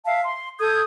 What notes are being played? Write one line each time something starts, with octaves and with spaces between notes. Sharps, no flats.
E5 F5 A5
C6
A4 D#6 G6 G#6